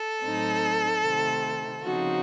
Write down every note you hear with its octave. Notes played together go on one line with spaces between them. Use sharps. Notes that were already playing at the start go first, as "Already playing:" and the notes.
Already playing: A4
A2 F#3 C4 D#4
C3 D#3 A3 C4
C#3 F3 C4 D#4 F#4